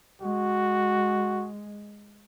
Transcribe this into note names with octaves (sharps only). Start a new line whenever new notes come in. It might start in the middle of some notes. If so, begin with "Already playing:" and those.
G#3 F#4